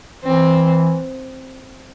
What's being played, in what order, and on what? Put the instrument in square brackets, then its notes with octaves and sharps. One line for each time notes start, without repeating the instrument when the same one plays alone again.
[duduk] E3 [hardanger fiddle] C4